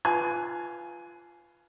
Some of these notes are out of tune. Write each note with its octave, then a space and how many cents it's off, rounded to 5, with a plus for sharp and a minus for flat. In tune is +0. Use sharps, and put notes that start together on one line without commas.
F4 -10 B4 +0 G#5 +15